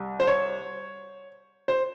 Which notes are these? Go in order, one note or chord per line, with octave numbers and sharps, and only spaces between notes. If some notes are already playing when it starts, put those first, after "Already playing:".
Already playing: C2
C5
C#5
C5